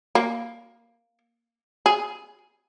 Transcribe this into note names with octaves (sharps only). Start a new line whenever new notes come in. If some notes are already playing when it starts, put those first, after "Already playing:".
A#3
G#4